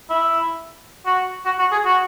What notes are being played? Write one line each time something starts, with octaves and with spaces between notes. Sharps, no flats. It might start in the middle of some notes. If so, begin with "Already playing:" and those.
E4
F#4
F#4
F#4
G#4
F#4